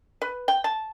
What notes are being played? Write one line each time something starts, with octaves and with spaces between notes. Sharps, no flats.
B4
G5
A5